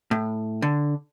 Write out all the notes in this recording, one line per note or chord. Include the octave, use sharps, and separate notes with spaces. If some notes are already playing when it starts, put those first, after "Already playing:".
A2
D3